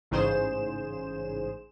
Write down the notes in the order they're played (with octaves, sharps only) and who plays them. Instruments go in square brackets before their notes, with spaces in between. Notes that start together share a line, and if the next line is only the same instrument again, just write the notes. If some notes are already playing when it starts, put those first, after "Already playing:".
[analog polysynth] A1 G#2 C#3 G#4 C5 E7